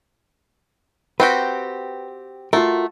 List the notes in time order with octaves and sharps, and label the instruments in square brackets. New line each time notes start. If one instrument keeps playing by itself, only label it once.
[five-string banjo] C4 F#4 G4 [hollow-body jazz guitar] B4
[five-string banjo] A3 [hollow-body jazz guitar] F4 F#4 A#4